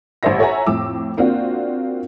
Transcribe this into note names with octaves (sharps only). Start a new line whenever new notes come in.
A1 G3 C5 E5 A#6
A4 C#5 E5 F#5 G#5 A#5
F2 A2 D6 E6
A#3 C4 D4 F4 F#4